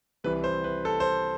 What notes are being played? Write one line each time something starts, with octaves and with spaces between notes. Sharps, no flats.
C2 C3 E3 B4
C5
B4
A4
C5